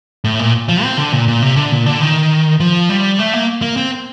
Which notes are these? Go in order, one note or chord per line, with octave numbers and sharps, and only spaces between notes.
A2
A#2
F3
C4
D3
A#2
A#2
C3
D3
A#2
D3
D#3
F3
G3
A3
A#3
A#3
C4